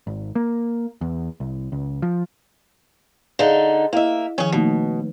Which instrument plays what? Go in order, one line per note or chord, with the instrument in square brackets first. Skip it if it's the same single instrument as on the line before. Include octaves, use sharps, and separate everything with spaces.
[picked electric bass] G#1
A#3
E2
C2
C#2
F3
[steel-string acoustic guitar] D3 D#4 [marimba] G#4 F5
[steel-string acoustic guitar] A#3 E5 [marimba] E4 D#5
[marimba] D#3 F3 [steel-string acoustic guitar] C#4 G#4
[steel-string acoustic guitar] B2 [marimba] A3 A#3 D#4